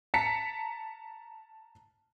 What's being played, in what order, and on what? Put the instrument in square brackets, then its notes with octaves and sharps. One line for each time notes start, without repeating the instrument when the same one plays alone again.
[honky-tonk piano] A5 A#5 B6 C#7